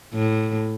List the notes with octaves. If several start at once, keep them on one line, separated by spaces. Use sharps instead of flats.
A2